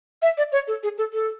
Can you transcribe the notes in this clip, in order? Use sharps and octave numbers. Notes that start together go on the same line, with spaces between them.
E5
D5
C#5
A4
G#4
A4
A4